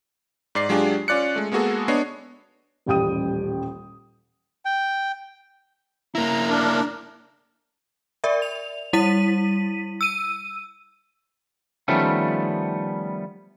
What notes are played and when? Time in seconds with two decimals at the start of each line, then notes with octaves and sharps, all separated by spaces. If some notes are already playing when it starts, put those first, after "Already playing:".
0.55 G#2 D5 C7
0.69 F#3 G#3 D4 F4 G4 G#4
1.08 C#4 F4 D5 F#6 C#7
1.36 G#3 A3
1.52 G#3 A#3 B3 F#4 G#4 A4
1.88 B3 D4 C#5 D#5 C7
2.86 D#1 A1 G3 G5 D#6 D#7
4.65 G5
6.15 A#3 E4 A#5
6.49 D4 A#4
8.24 A#4 D5 E5
8.42 F7
8.93 G3 E4 B6 D#7
10.01 E6 D#7
11.88 D#3 F3 G3 A3 B3 C#4